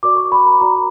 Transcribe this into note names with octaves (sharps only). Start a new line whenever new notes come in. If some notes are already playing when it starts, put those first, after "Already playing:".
F#4 A#4 D5 D6
C#6
B5
A#5
F#4 A#4 D5 A#5